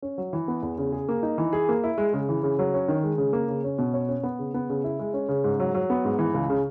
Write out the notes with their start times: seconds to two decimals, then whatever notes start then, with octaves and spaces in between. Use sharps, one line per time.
0.02 C#4
0.18 F#3
0.33 E3
0.48 B3
0.63 E2
0.78 C#3
0.92 G#4
1.09 A#3
1.23 D#4
1.38 E3
1.53 G#4
1.69 A#3
1.84 E4
1.98 G#3
2.13 C#3
2.29 E3
2.43 C#3
2.59 F#3
2.74 C#4
2.88 D#3
3.03 G#3
3.18 C#3
3.33 A#3
3.48 C#3
3.64 C#4
3.78 B2
3.94 C#5
4.09 C#4
4.23 B3
4.39 C#3
4.54 B3
4.70 C#3
4.84 E4
4.99 G#3
5.14 C#4
5.29 C#3
5.44 G#2
5.60 F#3
5.74 F#3
5.90 B3
6.05 G#2
6.19 E3
6.34 C#2
6.50 C#3